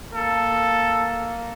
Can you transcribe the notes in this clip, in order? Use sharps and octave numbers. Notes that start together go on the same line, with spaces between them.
A#3 A4